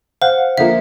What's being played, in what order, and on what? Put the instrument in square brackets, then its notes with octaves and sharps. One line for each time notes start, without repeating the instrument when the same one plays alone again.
[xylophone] C5 [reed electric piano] F5 F#5
[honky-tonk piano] D3 F3 A#3 [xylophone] E5